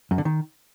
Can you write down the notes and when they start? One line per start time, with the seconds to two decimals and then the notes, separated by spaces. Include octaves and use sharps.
0.11 F#2
0.18 D3
0.25 D#3